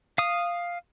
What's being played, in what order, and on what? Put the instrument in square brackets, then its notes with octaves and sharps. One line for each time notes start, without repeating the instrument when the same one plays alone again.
[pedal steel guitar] F5 D#6